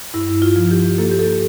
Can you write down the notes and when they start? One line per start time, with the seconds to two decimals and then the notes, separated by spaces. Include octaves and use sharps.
0.14 G2 E4
0.42 F4
0.56 F3
0.71 G4
0.98 A#3 A4
1.11 G4
1.19 A4